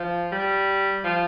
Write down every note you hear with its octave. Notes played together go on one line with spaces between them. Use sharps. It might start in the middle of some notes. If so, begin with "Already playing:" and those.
Already playing: F3
G3
F3